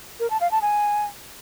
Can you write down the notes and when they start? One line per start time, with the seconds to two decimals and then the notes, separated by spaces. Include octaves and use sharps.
0.20 A#4
0.30 A5
0.41 F5
0.51 A5
0.62 G#5